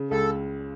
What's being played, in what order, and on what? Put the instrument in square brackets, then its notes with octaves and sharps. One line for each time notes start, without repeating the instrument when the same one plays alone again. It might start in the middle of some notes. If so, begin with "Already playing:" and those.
Already playing: [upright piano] C#3
[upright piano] C#2 [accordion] A4